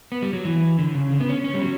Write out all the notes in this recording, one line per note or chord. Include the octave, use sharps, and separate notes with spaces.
B3
G3
F#3
E3
D3
C#3
D3
B3
C#4
C#4
G3
F#3